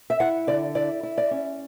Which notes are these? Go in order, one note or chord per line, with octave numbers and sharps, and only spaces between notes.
E5
E4 F#5
D3 D5
E4 D5
E4
D5
C#4